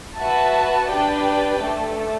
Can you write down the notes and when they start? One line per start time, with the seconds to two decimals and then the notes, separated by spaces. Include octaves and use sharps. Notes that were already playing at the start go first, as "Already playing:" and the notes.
0.16 F#4 B4 E5 A5
0.89 D4 G4 B4 D5 G5
1.62 A3 D4 A4